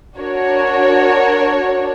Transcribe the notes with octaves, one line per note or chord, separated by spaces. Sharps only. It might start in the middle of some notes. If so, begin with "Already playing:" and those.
D4 F#4 A#4 C#5